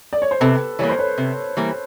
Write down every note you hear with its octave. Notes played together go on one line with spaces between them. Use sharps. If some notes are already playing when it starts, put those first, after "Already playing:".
D5
C#5
C5
C3 A4 B4
E3 G3 A#3 C#5
C5
B4 C#5
C3
E3 G3 A#3